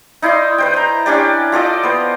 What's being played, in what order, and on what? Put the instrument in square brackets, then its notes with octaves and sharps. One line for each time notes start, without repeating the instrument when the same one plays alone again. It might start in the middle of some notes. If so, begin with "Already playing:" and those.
[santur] D#4 E4 D5 C6
B4 C5 G5
C5 A#5
C#4 D4 G4 D5
F4 A4 D5 D#5
B3 C5